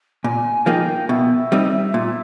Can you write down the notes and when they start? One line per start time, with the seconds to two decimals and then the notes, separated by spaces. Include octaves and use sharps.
0.24 A#2 G#5
0.66 F3 A#3 D#4 G#4 G5
1.09 B2 E5
1.52 G3 C4 D#4
1.94 A#2